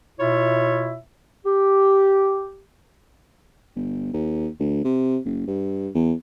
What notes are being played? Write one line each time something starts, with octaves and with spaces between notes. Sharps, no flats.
B2 E4 F4 C#5 E5
G4
G1
D#2
D2
C3
F#1
G2
E2